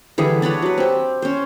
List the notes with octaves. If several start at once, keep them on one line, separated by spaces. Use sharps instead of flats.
D3 E3 G3 G#4
D4 B4 C#5 F#5
F#3 B4
C4 G4
C#4 C5